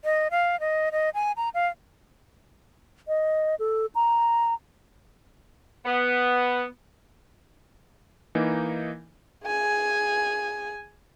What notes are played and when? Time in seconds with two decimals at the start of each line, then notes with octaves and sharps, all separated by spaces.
0.04 D#5
0.31 F5
0.60 D#5
0.92 D#5
1.14 G#5
1.37 A#5
1.54 F5
3.08 D#5
3.59 A4
3.95 A#5
5.86 B3
8.35 E3 A#3 D#4
9.46 G#4 G#5